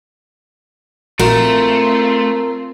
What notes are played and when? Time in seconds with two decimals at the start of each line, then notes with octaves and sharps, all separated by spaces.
1.19 A#1 A#2 A3 C4 F4 F#4 A#4